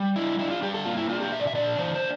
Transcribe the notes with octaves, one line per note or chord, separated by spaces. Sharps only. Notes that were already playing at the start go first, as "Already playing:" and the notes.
Already playing: G3
D4 E4
D4 E4
F4
G3 G4
A4
A#3 F4
E4
D4 F4
G4
A#2 E5
D5
E5
D4 D5
E3 C5
C5